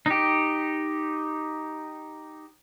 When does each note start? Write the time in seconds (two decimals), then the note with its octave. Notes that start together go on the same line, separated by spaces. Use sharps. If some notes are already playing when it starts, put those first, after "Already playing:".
0.06 D#4 G4